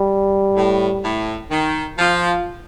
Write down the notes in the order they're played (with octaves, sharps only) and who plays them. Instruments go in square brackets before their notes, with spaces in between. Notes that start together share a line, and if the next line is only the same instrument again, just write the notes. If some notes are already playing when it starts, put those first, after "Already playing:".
Already playing: [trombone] G3
[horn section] A2
A2
D#3
[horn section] F3 [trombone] F4